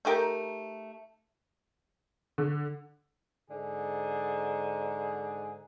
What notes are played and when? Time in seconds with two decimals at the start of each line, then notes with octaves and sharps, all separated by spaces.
0.05 A3 D#4 G4 A#4
2.38 D3
3.51 G#2 D3 G#4